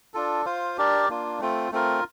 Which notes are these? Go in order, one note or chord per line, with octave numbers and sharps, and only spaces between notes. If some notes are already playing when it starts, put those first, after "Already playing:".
D4 F4 A4
F4 C5 F5
D4 G4 A#4 D5
A#3 D4 F4
A3 C4 F4
A3 C4 F4 A#4